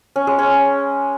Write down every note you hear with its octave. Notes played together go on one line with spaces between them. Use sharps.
C#4
G#3
C#4